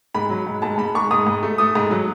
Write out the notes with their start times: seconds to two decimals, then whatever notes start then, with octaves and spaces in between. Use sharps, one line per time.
0.15 G#2 B5
0.30 F#3
0.47 G#2
0.62 G#2 A5
0.78 G#2 B5
0.95 G#2 C#6
1.11 G#2 D#6
1.27 G#2
1.43 A3
1.58 A3 D#6
1.75 G#2
1.91 F#3